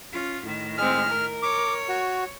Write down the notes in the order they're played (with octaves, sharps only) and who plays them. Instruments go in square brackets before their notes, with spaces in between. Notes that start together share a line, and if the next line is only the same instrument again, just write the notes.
[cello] C#4 F4
A2 D#3
[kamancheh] G#3 C4 [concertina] F6
[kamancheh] A#4
[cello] C#5 [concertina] D6
[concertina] F#4